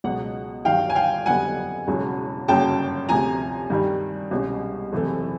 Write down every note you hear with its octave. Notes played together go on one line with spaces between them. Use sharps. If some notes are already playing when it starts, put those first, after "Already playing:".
C#2 B2 F#3 F#5
G1 G2 D#3 F#3 F5 G5
G#5
F5 G5
F#1 F2 D3 G3 B3 F#5 G#5
E1 E2 C#3 F#3
G1 F#2 C#3 F#3 A#3 G5 A5
D2 C3 F3 G#5 A#5
G2 D#3 G3
C2 B2 G#3 C#4
F#1 E2 C3 E3 A3